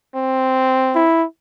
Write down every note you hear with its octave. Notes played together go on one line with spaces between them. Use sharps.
C4
E4